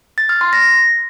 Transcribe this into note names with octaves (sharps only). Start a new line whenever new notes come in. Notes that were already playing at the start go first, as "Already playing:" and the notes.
A6
F6
C6
A#6